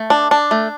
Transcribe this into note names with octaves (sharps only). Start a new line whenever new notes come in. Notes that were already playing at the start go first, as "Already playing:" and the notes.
Already playing: A3
D4
D4
A3